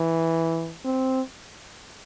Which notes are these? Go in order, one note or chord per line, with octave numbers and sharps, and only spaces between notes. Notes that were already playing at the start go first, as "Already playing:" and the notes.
Already playing: E3
C4